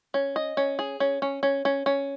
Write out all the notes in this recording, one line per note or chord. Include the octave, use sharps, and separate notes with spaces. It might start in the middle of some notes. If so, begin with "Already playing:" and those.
C#4
D#5
C#4
G#4
C#4
C#4
C#4
C#4
C#4